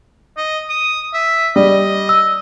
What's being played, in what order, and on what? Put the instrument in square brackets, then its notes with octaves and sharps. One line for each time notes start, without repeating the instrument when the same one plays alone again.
[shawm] D#5
D#6
E5
[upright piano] G3 [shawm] D#5
[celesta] E6